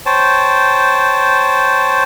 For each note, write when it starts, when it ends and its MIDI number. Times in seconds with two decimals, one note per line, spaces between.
0.06 2.04 72
0.06 2.04 73
0.06 2.04 79
0.06 2.04 81